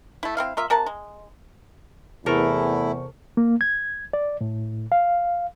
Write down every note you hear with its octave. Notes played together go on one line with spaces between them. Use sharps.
A3 E4
C4 E4 F5
A#3 F4 E5
C3 A#4 F#5 A5
G#3
E2 C3 A3 E4 A4 A#4 C5 C#6
A#3
G#6
D5
A2
F5